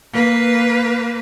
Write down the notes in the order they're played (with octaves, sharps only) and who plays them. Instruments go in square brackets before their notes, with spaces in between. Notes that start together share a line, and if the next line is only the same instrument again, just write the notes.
[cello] A#3 B4